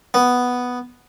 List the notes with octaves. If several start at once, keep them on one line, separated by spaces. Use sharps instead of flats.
B3